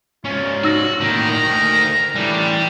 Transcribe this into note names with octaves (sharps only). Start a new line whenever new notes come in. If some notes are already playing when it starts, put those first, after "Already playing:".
G#2 C#4 F4
D#4 F#4 E6 A#6
A2 D#3 A#3 A#5
D2
A2 E3 G3 D4